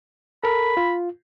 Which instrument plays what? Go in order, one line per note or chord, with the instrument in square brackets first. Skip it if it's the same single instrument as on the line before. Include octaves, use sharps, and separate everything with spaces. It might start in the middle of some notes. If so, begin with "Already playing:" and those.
[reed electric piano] A4 A#4 [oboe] B5
[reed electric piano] F4